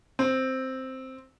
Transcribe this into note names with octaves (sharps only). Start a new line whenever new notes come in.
C4